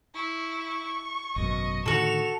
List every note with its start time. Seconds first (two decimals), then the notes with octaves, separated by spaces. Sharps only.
0.14 E4 C#6
1.36 G#1 F#2 B2 D#5
1.86 A2 D3 D#3 F#4 A4 E7 F7